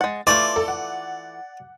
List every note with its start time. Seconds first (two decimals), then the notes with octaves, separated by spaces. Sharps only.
0.01 G#3 F#5 A6
0.27 E3 A3 F4 D5 C6 D6
0.56 A4
0.68 F#5